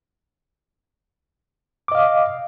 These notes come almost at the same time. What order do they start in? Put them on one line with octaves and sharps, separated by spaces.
D6 D#5 F5